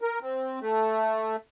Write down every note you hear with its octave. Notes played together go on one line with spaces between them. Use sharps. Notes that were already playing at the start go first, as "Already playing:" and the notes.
A#4
C4
A3